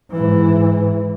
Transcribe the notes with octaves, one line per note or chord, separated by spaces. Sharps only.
G#2 E3